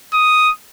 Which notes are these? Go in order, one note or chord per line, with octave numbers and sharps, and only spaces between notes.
D#6